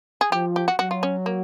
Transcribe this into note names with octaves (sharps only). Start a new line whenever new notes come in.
G#4
F3 G4
G4
F#4
F#3 F#4
F4
C#4
A#3